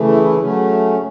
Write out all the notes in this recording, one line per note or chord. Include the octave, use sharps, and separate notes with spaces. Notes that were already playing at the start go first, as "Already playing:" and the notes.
Already playing: C#3 E3 A3
E4
E4
C#3 F#3 A3 C#4